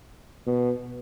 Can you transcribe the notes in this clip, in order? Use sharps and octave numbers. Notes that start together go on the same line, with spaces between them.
B2